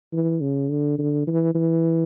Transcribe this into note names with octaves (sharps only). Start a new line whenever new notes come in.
E3
C#3
D3
D3
E3
E3